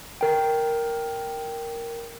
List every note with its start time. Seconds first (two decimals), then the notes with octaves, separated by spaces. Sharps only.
0.21 A#4 G5